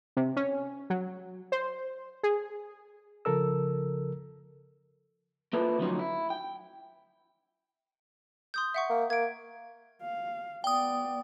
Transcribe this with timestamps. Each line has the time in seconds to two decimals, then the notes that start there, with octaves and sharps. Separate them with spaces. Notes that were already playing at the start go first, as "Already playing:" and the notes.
0.17 C3
0.36 C#4
0.90 F#3
1.52 C5
2.23 G#4
3.25 C#3 F3 A4 A#4 E6
5.53 A#3 E4 F4 A4 B4 C5
5.78 D2 F3 F#3 C#4 D#4 C6
5.99 E4
6.30 G5
8.54 C6 D#6 G6
8.74 E5 F#5 C#6
8.90 A#3
9.10 A#3 G#6 D7
10.02 F5
10.64 B3 D5 G5 D#6